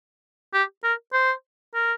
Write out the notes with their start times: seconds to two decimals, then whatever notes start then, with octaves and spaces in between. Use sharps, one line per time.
0.53 G4
0.84 A#4
1.13 C5
1.75 A#4